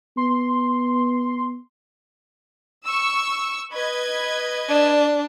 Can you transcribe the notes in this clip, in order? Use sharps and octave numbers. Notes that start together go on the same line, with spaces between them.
B3 C6
C#6 E6
B4 D#5 G#6
D4 D5